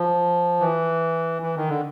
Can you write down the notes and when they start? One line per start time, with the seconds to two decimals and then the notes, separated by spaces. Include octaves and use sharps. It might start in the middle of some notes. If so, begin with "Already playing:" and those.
Already playing: F3
0.61 E3
1.42 E3
1.56 D#3
1.68 D3